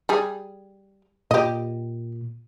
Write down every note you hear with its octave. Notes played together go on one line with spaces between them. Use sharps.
G3 G#4
A#2 G4 D#5